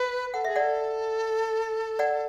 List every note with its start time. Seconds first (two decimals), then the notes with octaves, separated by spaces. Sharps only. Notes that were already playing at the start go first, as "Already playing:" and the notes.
Already playing: B4
0.34 A4 F#5
0.45 G#4 E5
0.56 A4 D5 F#5
1.99 D5 F#5